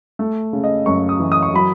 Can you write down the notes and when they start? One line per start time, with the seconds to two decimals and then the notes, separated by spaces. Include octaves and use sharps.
0.19 A3
0.53 C#3
0.64 D#5
0.86 F#2 C#6
1.09 D#6
1.20 E3
1.32 D#6
1.43 C#6
1.53 F#3 B5